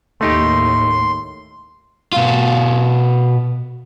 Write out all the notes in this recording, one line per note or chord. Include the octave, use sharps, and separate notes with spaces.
D#2 A2 A3 D#4 G4 C6
B2 F4